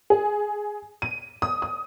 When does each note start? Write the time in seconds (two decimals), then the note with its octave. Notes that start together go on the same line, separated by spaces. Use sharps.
0.10 G#4
1.02 D#7
1.42 D#6
1.62 D#6